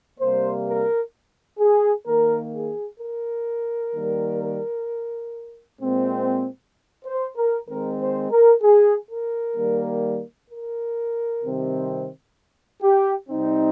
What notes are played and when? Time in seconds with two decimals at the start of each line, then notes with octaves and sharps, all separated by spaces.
0.20 C3 G3 A#3 C5
0.67 A#4
1.59 G#4
2.06 D#3 A#3 A#4
2.54 G#4
3.00 A#4
3.94 D#3 G3 A#3
5.81 A#2 G#3 C4
7.05 C5
7.37 A#4
7.68 D#3 G#3 C4 A#4
8.00 C5
8.31 A#4
8.62 G#4
9.09 A#4
9.56 D#3 G3 A#3
10.49 A#4
11.42 C3 D#3 G3 C4
12.82 G4
13.29 C3 G3 C4 D#4